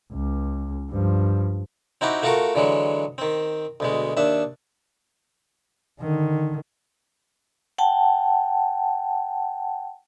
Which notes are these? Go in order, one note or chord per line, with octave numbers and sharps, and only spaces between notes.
C#2
G2 F3
C4 D#4 E4 F#4 G4
A3 F4 F#4 A4 A#4
D3 E3 F#3 G#3
D#3 C4
D2 B2 G#3
D#2 D4 E5
D3 D#3
F#5 G5 A5